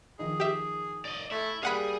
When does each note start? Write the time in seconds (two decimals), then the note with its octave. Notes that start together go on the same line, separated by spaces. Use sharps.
0.19 D#3 F3 D#4 G#4
0.40 G4 E5
1.05 D5 D#5
1.31 A3 E4
1.63 G3 A#3 G#4 F5 F#5 B5